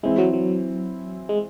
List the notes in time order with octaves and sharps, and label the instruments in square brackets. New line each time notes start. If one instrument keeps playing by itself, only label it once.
[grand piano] E3 C4 E4 [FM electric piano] G#3
[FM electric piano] F#3
F#3
G#3